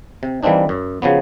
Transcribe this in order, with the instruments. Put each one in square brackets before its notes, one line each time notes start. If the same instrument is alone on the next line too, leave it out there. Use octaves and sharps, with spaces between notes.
[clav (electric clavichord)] C3
E3 G3 A#3 C4 D4 D#4
F#2
C#3 F3 F#3 B3